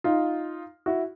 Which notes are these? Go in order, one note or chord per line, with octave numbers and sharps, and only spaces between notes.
D#4 F4
E4 F#4